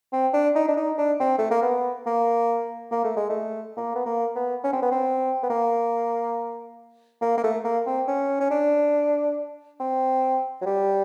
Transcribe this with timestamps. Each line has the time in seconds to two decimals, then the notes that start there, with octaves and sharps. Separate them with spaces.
0.13 C4
0.34 D4
0.55 D#4
0.68 D4
0.77 D#4
0.98 D4
1.20 C4
1.38 A3
1.51 A#3
1.62 B3
2.06 A#3
2.91 A#3
3.04 A3
3.16 G#3
3.29 A3
3.77 A#3
3.95 B3
4.06 A#3
4.35 B3
4.64 C#4
4.73 C4
4.82 B3
4.91 C4
5.43 B3
5.50 A#3
7.22 A#3
7.38 A#3
7.43 A3
7.64 A#3
7.86 C4
8.08 C#4
8.40 C#4
8.50 D4
9.80 C4
10.61 F#3
10.66 G3